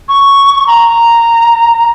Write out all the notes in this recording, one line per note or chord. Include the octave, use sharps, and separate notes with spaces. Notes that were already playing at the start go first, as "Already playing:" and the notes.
C#6
A#5